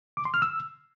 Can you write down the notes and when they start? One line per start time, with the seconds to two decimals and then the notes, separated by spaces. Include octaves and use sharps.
0.17 D6
0.25 C6
0.34 F6
0.42 E6